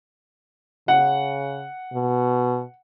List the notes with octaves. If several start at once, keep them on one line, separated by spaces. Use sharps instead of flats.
C#3 F#5
B2